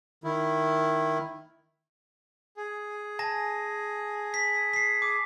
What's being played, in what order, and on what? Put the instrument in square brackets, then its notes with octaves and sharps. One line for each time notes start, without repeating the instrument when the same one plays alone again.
[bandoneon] D#3 E4
[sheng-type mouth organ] G#4
[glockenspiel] G#5 A5 A#6
B6
B6 C7
D6